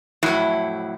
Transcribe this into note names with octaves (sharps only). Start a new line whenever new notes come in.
F2 A2 F#3 E4